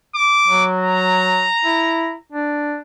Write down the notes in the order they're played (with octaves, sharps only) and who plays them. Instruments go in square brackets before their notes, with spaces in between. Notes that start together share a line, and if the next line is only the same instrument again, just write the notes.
[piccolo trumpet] D6
[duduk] F#3
[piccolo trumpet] A#5
[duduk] E4
D4